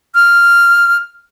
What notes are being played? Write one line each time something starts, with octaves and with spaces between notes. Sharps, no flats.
F6